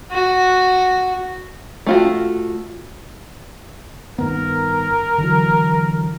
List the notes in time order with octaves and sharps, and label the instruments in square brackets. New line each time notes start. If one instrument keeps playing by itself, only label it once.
[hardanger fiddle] F#4
[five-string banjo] A3 F4 F#4
[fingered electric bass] G2 D#3 B3 [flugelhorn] A#4
[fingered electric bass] D3 E3 F#3